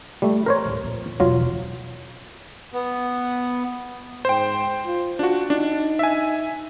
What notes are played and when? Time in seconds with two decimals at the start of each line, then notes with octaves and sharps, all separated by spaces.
0.22 G3 A3
0.46 A#4 C5 C#5
0.65 D2 A2
0.84 F2 A#2
1.20 E1 C#2 F#3 F4
2.73 B3
4.25 G#2 C5 G5
4.86 F4
5.19 D4 F4 F#4
5.50 D4 D#4
5.99 E5 G#5